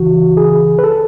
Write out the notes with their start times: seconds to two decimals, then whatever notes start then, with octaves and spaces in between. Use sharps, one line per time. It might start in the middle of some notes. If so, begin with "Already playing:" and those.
Already playing: C#2 C#3 E3 F#4
0.37 G#4
0.79 B4
0.84 A4